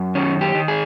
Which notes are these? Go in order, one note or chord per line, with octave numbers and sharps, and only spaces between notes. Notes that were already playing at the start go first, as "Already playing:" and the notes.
Already playing: F#2
D#3 C#4
G4
D#3
G#4